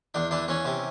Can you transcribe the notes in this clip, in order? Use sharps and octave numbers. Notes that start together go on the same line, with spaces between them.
E2 D4
E3 D4
E3 C#4
C3